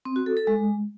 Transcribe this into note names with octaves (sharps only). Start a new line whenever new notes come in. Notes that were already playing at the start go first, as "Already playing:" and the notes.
C4
F#4
A4
A4
G#3